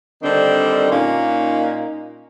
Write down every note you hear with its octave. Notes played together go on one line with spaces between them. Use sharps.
D3 D#3 G3 C4 D4
A#2 A#3 C#4 D#4